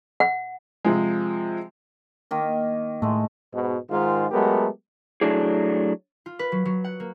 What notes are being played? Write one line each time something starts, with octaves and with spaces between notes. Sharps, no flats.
F#5
C3 F3 G#3
D#3 A#3
A2 G#3 A3
G#2 B2
G#2 D#3 F4
F#3 G#3 A3 B3 G4 A#4
F#3 A3 D4 E4 G#4
F4
B4
F#3
F#3
F#5
A#3